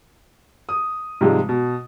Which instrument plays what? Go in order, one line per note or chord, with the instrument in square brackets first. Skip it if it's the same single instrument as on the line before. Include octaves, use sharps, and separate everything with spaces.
[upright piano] D#6
G#2 C3 F3 G3 G#3
B2